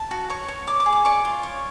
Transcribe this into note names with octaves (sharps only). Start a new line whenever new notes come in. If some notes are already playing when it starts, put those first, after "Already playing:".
Already playing: A5
F#4
C#5 C#6
C#5
D5 D6
D6
G#4
D6
D5 C#6
F4
C#5